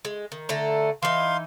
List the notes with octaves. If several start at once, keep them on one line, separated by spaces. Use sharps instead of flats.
G#3
D#3
D3 A3 A#5
E3 D#4 F5 C6